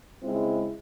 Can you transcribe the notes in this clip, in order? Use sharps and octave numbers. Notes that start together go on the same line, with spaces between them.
C#3 G#3 C4 E4